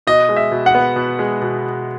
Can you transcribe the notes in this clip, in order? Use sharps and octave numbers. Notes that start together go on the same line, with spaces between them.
B2 D#5
G#3
E5
B2
F#5
B3
B2
G#3
B2